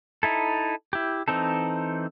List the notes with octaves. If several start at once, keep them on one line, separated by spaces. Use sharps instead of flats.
D#4 E4 A4
E4 G4
E3 C4 D#4 A4